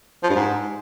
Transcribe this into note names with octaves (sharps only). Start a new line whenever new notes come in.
F3
G2
G#2